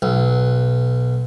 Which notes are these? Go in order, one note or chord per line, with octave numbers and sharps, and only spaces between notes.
B1